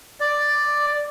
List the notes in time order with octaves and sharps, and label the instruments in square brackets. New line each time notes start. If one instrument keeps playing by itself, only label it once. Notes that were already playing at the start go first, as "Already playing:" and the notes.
[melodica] D5